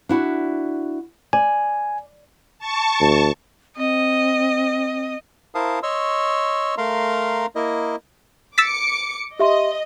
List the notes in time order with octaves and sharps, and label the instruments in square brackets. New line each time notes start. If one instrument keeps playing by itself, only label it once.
[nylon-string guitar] D4 E4 F#4
[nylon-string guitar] D5 [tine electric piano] G#5
[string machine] A5 C#6
[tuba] D2
[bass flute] C4 [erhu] D#5
[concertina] E4 A#4 C5 F5 A5 D#6
C#5 D#5 C6 C#6 E6
A3 A#4 F5 A#5 C6
A#3 E4 A#4 D#5
[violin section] D6 C#7 [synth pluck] E6 A6 B6
[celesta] G4 E5 C6 [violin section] D#5